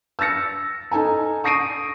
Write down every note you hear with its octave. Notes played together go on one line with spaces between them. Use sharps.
E6 F6 A6 A#6 C#7
D#4 A4 G#5 A#5
C#6 D#6 A#6 C7 D7 D#7